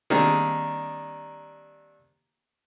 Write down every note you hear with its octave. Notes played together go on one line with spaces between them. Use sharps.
D#3 G3 A#3 C4 D4 G#4